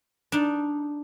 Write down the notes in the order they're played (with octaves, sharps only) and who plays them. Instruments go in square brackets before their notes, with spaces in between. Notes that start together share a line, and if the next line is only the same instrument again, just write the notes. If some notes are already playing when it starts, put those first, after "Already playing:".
[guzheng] D4 D#4